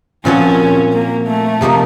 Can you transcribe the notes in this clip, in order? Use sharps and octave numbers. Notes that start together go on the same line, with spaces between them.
A#2 F3 C4 C#4 F#4
A#3
A3
C3 F3 A#3 D#4